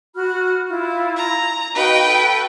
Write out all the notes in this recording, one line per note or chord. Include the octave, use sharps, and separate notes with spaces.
F#4 B5 F6
E4 F4
A#5
D#4 F#4 B4 F5 G5
F#4 A4